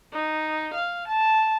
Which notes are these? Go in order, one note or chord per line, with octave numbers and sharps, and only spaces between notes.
D#4
F5
A5